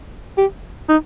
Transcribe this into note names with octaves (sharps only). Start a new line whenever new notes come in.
G4
D#4